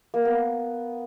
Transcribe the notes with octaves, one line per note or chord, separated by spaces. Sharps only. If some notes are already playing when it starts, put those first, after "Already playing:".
A#3
B3